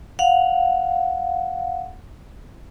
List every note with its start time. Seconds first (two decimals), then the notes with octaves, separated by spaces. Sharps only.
0.19 F5 F#5